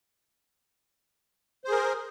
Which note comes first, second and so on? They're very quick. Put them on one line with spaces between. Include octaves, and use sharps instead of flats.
C5 G#4 A#4